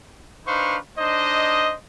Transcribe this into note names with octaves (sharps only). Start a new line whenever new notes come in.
D4 D#4 B4 C5 F5 C#6
D4 D#4 C5 D#5